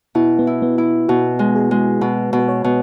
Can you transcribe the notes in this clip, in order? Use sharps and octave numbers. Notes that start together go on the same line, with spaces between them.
B2 E4
B3
E4
B3
E4
B2 F#4
G#3
G#4
G#3
B2 B4
B2
B4
C#5
B2